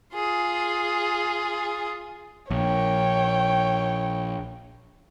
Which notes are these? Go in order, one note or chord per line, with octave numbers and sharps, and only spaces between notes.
F4 G#4
A#1 C#5 G5